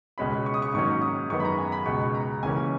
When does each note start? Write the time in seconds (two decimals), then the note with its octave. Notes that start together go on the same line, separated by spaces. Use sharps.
0.18 C#2 B2 G#3 C#4 B5
0.46 C#6
0.54 D#6
0.62 C#6
0.74 G#2 D#3 F#3 A#3 C#4 C#6
1.02 D#6
1.30 F#2 D#3 G#3 B3 C#6
1.40 B5
1.45 A#5
1.58 G#5
1.72 B5
1.86 C#2 B2 G#3 C#6
2.15 A#5
2.43 C#2 C#3 E3 A#3 C#4 G#5